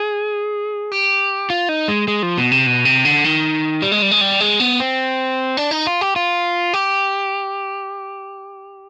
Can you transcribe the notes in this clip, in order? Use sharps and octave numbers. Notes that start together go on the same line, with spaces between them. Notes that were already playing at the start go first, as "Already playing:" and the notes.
Already playing: G#4
G4
F4
D#4
G#3
G#3
F3
B2
C3
B2
C3
D3
D#3
G3
G#3
G3
G#3
G3
G#3
B3
C4
D4
D#4
F4
G4
F4
G4